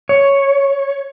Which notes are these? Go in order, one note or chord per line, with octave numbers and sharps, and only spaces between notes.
C#5